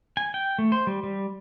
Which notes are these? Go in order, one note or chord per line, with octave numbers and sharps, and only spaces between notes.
G#5
G5
A3
C5
G3
G3